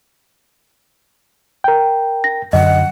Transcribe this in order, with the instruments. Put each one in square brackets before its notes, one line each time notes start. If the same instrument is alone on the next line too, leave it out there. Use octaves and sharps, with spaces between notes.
[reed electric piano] A#4 G5
[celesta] A#6
[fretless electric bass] F#2 D3 [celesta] D#5 [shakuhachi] F#5